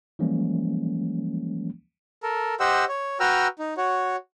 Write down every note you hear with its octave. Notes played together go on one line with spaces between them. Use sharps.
E3 F3 G3 G#3 A#3 C#4
A4 A#4
G4 C5 D#5 F#5 E6
C#5
F#4 B4 G5 A#5 E6 F6
D#4
F#4 C#5